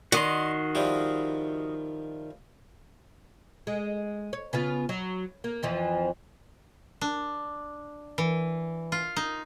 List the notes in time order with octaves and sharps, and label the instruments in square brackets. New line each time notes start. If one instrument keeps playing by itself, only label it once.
[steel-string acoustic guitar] D#3 [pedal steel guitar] F#4 D#5 C6 [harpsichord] D5 F#5 A5
[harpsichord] F3 G3 E4
[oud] G#3
C#5
C#3 B3 F4
F#3
A#3
F2 E3 F3
[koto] D4
E3
F4
D#4